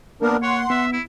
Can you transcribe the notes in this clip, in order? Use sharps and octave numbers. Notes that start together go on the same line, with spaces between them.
A#3 B3 D4 A#4
C#5 F#5 C6
B3 E5
E4